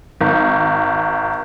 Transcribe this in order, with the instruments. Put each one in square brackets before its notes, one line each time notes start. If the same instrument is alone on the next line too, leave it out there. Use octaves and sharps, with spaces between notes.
[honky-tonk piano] G#1